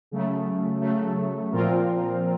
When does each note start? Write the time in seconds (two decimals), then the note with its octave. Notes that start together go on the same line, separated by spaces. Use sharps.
0.11 C#3 F#3 A3
0.81 C#3 F#3 A3
1.52 A#2 F3 C4 F4 A#4